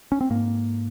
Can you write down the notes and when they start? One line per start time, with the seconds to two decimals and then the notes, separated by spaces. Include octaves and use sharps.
0.12 C#4
0.21 C4
0.30 G#2 A#3